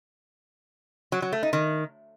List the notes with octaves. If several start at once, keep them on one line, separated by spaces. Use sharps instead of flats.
F#3
F#3
A3
D#4
D#3